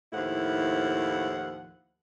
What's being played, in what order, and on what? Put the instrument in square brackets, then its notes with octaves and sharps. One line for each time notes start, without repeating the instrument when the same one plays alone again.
[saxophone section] D#2 A2 F3 E4 F#5